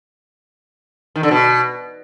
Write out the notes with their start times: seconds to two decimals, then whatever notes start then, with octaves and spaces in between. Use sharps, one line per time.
1.16 D#3
1.23 D3
1.31 B2